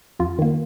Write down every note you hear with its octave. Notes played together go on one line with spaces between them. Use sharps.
F2 F4
D#3 A#3